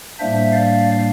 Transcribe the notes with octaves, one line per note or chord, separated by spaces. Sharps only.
A2 G3 A#3 D4 C5 E5
D5 F5